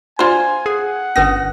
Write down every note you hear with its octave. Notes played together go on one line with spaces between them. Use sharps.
D4 F4 C5 D5 G#5
G#4 F#5
G1 C#4 D4 B4 D#6 A#6